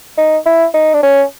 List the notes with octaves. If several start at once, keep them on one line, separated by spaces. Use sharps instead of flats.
D#4
E4
D#4
D4
C#4